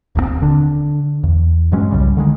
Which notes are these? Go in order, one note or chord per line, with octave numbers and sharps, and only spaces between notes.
D1 D#2 F3 C4
D3 D4
E2
G2 F#3 G#3 C#4
C2 C#3 G3
D3 D#3 G#3